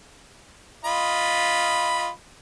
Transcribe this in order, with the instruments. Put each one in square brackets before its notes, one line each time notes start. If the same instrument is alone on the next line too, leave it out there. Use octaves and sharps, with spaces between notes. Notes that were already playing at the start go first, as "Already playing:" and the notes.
[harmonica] F4 D#5 B5